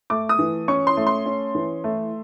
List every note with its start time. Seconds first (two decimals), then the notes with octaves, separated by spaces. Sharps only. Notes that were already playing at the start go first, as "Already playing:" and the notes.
0.10 A3 D6
0.29 D#6
0.39 E3
0.68 C#4 C#6
0.87 C6
0.97 A3
1.07 C6
1.26 C#4
1.55 E3
1.84 A3